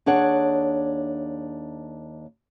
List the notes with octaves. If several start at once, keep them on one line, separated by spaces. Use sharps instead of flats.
D#2 D4 G#4 C#5 F#5